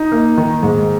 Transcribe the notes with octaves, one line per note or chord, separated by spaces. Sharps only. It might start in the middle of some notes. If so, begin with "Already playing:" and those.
Already playing: D#4
A#3
D#3
G#2